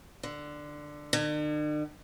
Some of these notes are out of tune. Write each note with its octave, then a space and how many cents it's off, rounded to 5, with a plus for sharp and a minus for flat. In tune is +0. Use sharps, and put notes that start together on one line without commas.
D3 +10
D3 +45